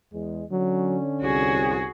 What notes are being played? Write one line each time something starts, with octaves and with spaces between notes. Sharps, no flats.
E2 G#3
D3 F#3 C#4
C2 F#4 G#4